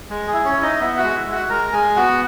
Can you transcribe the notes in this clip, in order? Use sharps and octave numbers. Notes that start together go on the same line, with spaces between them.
G#3
G#4
E4
C#4 C#5
E4
D#4 D#5
B3 E4 E5
F#4 F#5
G#3
E4 E5
G#3
F#4 F#5
G#3 A#4 A#5
G#3 G#4 G#5
B3 F#4 F#5